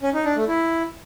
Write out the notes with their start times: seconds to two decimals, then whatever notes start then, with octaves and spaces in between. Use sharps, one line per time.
0.02 C#4
0.14 D#4
0.25 D4
0.36 A3
0.48 E4